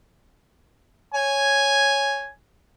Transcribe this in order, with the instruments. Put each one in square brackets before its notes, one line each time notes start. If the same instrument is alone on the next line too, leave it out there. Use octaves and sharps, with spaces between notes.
[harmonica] C#5 G#5